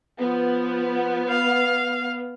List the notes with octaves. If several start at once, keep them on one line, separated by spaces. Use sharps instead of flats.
F3 B3
F5